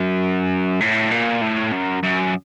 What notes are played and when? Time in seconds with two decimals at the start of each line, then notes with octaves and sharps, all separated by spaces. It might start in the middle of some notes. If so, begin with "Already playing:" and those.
Already playing: F#2
0.80 A2
1.11 A#2
1.42 A2
1.72 F#2
2.03 F#2